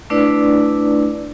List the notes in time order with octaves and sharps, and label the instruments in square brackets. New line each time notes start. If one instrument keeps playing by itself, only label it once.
[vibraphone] A3 D4 E4 B4 D5